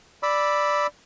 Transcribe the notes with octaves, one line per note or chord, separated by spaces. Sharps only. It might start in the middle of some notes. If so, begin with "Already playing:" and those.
D5 B5 E6